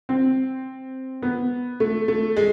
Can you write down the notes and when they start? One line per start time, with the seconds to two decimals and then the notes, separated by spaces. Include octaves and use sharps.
0.09 C4
1.22 B3
1.80 A3
2.08 A3
2.37 G#3